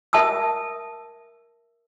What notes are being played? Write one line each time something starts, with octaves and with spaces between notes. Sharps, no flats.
A#4 E5 A5 D#6 E6